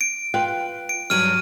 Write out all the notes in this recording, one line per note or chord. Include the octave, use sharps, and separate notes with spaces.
D7
F4 B4 G5
D7
G2 F#3 F6 D#7